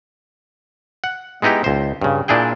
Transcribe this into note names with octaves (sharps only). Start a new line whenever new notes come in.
F#5
G#3 B3 D#4 E4 G4
C#2 C5
G2 C#3
A#2 D4 E4 G#4 G5